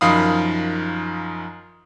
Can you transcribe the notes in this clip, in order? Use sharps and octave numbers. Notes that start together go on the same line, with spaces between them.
F#2 D#3 F3 F5 B5 D#6